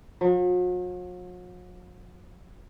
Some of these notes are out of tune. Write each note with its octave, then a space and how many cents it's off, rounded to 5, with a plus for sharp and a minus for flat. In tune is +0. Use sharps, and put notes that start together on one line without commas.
F#3 -45